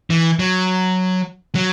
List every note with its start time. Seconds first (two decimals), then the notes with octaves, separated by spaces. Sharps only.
0.10 E3
0.39 F#3
1.55 F#3